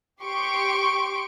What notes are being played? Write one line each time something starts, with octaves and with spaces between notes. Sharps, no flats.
G4 C6 C#6 D7